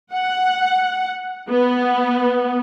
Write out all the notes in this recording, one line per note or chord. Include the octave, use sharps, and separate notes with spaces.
F#5
B3